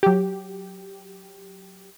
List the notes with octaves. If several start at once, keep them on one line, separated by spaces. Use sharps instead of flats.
F#3 G4